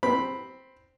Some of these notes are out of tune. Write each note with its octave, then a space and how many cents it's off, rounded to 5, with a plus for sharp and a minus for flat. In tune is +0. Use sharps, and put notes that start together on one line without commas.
C4 +0 B5 +0